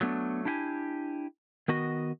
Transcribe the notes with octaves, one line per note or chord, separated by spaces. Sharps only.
F#3 A3 B3 D4
D4 E4 G4 F#5 G#5
D#3 B3 F#4 D#5